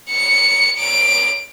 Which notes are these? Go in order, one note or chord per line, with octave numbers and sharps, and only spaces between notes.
C#7
D7